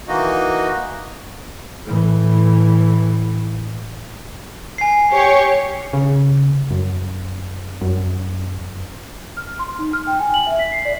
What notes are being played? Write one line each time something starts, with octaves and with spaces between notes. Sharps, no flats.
E3 A#3 D#4 F#4 D#5
A2 E3
G#5 C7
G4 C#5
C#3
F#2
F#2
F6
C6
D#4
F6
G5
G#5
F#7
E5
B6
C7
D5